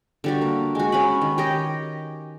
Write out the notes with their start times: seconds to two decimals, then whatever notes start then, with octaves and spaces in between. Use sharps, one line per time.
0.24 D3 G3 F#4
0.42 A#3
0.75 G#3 F#4
0.92 C#4 B4 G#5 B5
1.21 D#3
1.38 G4 C#5 D#5